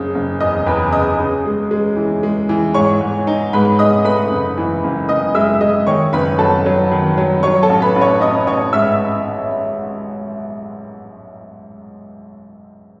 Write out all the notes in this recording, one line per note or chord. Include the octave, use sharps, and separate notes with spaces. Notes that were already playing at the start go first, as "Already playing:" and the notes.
Already playing: F#1 C#3 D#6
F#1
E2 D#5 D#6
E2 B4 B5
C#3 D#5 D#6
C#3
G#3
G#3
E3
G#3
E3
G#2 C#5 C#6
G#2
D#4
G#2 B4 B5
G#2 D#5 D#6
A3 B4 B5
F#1
E3
F#1
F#1 D#5 D#6
G#3 E5 E6
G#3 D#5 D#6
D#3 C#5 C#6
F#1 B4 B5
F#3 A4 A5
F#3
D#3
F#3
F#3 C#5 C#6
A4 A5
A1
B4 B5
A1
C#5 C#6
A1 D#5 D#6
A1 C#5 C#6
G#2 E5 E6